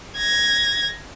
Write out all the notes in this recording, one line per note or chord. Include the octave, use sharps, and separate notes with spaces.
G#6 A#6